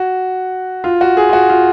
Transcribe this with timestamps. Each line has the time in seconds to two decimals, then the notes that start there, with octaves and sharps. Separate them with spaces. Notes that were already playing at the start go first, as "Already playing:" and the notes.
Already playing: F#4
0.84 F4
1.01 F#4
1.17 G#4
1.29 F4
1.33 F#4
1.50 F4